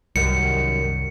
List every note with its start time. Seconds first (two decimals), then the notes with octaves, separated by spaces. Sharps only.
0.16 C2 F#2 D#3 G3 C#7